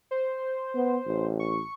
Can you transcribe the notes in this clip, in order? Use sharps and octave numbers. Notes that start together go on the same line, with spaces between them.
C5
B3
A1
C#6